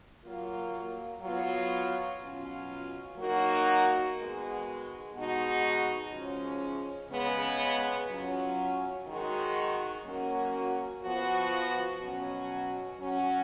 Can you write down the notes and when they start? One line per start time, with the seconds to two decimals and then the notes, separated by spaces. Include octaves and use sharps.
0.24 F#3 A#3 F4
1.22 F#3 B3 F4
2.20 B2 F#3 C#4 F4
3.18 F#3 A#3 D#4 F#4
4.16 D#3 G#3 B3 F#4
5.14 B2 G#3 D#4 F#4
6.11 C#3 F3 G#3 C#4
7.10 C#3 G#3 B3
8.08 F#3 C#4 F4
9.06 D#3 G#3 D#4 F#4
10.04 F#3 A#3 C#4 F#4
11.03 F3 B3 F#4
12.00 B2 F#3 C#4 F#4
12.98 F#3 C#4 F#4